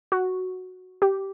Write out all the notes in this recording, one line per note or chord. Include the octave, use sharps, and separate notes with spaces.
F#4
G4